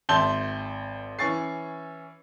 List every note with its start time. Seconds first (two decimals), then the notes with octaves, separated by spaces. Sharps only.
0.09 G#1 E5 A5 C6 G6 G7
1.19 E3 C#4 C#6 A6 C7